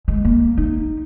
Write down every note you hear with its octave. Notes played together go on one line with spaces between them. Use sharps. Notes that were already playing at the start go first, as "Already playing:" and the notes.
G#3
A#3
D#4